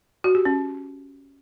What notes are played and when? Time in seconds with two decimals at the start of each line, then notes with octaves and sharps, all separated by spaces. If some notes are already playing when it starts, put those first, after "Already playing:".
0.24 F#4
0.35 G4
0.45 C#4